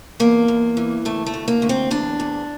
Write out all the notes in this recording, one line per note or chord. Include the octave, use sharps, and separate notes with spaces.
E2 A#3
E2
E3
D2 A3
A3
D2
A#3
D2
C4
E2 D4
E2